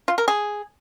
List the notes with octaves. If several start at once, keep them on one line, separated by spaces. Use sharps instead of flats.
F4
A#4
G#4